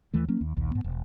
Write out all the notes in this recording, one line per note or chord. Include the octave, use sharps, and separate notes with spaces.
D#2 E3 A3
F#3 A#3 C#4
D#2
A#1 D#2
G#2 B3
E1